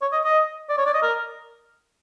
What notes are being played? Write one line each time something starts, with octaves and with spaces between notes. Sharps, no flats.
C#5
D#5
D#5
D5
C#5
D5
D#5
A#4